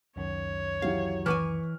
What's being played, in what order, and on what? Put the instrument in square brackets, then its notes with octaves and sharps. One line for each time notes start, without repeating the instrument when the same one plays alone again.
[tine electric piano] C#2 F#2 D#3 [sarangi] C#5
[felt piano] E3 F#3 G4 [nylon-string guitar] F5
[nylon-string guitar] E3 B4 G#5 [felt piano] C#6 D6 F6